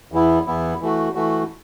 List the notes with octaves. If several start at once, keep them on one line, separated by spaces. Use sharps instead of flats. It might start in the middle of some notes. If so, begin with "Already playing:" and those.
E2 E3 B3 E4
E2 E3 B3 E4
E3 A3 F#4
E3 A3 F#4